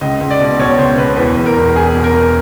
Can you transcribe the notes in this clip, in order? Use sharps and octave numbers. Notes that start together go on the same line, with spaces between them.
C#2 D#5
C#2
D5
B2
B2 C#5
C#2 C5
B2 B4
E2 B4
E2
A#4
E1
E1 G#4
B2
A#4
E1